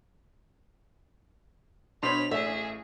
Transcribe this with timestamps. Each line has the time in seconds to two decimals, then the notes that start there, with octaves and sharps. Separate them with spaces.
2.03 B2 D4 C5 C#5 B5 C6 F7
2.31 A1 A3 G#4 E5